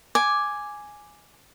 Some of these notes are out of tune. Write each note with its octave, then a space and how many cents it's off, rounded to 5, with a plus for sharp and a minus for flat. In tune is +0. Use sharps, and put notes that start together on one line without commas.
G#5 +0 D6 +0